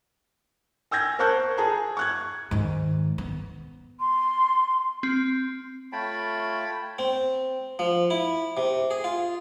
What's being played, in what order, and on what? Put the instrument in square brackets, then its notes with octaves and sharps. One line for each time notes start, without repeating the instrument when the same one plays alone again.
[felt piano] G#5 E6 G6 G#6 A#6
A#4 C5 A5 C#6 F#6 G6
G#4 A5 A#5
C#6 F#6 G#6
[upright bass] G#2 D#3
B3
[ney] C6
[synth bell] C4
[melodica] A3 F4 C#5 [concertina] G5 A5 B5
[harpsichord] C4
F3
E4
C3
G#4
F4